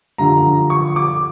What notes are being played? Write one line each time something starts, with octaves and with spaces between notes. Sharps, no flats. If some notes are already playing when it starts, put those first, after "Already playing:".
G2 D3 F3 A#5
C#6
D6